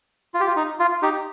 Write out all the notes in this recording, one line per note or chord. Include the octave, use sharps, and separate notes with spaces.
F4
G4
F4
D#4
F4
D#4 G4